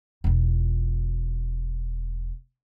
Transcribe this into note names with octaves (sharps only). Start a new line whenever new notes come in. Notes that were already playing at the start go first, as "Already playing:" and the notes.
E1 F4